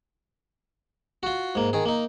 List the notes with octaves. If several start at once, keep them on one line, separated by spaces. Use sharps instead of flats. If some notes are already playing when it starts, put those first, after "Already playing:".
F4 F#4
G#2 A#3
D#3 G#4
A#3 D#4